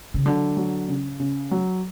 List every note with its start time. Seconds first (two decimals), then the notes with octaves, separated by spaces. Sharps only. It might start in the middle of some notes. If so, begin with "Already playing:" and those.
0.14 C#3
0.26 D3 F#3
0.57 F#3
0.88 C#3
1.20 C#3
1.51 F#3